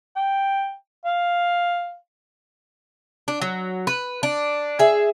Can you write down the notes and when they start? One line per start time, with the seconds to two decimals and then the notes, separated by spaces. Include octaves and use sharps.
0.16 G5
1.05 F5
3.28 D4
3.42 F#3
3.87 B4
4.23 D4
4.79 G#4 E5